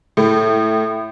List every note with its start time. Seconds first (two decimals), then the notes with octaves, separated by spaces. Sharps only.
0.17 A2